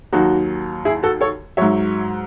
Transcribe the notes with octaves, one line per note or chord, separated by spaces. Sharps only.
D#2 D#3 F#3 D#4 F#4
E4 G#4
F#4 A4
A4 C#5
G#2 F#3 C#5 E5